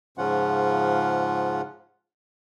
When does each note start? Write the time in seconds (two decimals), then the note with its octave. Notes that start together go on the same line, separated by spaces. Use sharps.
0.18 G#2 C#3 F3 C#4 F4 F#5